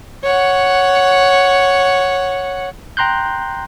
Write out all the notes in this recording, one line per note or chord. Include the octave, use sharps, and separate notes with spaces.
C#5 F#5
G5 A#5 C6 F#6 G6